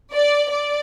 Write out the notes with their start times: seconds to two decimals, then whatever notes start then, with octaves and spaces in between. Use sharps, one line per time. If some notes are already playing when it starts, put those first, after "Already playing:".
0.13 D5
0.50 D5